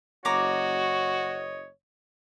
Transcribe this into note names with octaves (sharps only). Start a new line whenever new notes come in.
F#1 F#4 C#5 D#5 A#5 D6